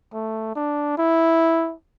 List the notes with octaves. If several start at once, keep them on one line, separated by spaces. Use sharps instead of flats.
A3
D4
E4